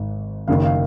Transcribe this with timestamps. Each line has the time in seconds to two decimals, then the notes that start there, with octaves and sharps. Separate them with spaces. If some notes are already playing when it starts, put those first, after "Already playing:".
Already playing: G#1 G#2
0.48 F#1 F#2 D#3 F5
0.64 F5